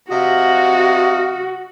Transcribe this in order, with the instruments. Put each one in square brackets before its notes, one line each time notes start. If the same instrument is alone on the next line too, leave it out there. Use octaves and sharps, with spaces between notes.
[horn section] C3 D#5 F5 [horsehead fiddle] F#4